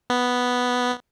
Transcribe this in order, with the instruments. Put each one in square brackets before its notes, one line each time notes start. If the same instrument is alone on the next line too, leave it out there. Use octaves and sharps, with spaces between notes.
[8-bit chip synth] B3